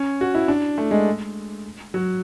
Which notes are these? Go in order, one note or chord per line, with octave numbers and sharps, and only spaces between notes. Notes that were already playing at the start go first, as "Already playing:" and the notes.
Already playing: C#4
F#4
E4
D4
A3
G#3
F#3